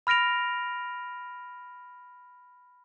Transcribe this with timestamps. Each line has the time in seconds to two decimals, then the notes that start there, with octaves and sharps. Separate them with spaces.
0.07 B5 F6 A#6 D7 F7